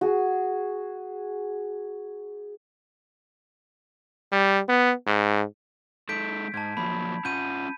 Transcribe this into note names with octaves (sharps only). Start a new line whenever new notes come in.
F#4 G#4
G3
B3
G#2
G#3 D#4 A4 G6 B6 D7
G#2 A5 G#6
F3 F#3 A#3 B5
C#4 F4 F#5 G6 D#7